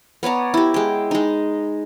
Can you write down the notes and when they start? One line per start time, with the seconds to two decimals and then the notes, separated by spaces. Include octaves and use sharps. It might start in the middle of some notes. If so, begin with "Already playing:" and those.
0.23 B3 C#5 D5 A#5
0.54 E4 G4
0.74 G#3 G5
1.11 G#3 D#4